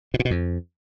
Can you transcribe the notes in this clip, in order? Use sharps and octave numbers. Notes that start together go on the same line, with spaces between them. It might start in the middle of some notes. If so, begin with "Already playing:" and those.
B2
A#2
B2
F2